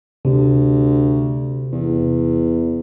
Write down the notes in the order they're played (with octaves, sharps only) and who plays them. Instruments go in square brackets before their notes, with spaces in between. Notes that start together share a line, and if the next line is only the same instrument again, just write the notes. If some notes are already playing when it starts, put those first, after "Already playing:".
[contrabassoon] D2 [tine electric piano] C3
[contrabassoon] E2